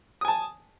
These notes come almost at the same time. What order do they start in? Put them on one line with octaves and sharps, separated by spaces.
D#6 G#5 A5